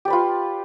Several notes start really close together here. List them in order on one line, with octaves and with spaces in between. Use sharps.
G4 D5 B4 F4